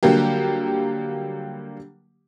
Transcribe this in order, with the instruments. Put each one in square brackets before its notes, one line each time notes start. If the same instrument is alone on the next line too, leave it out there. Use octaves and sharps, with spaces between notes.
[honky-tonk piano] D3 F#3 G3 A#3 G4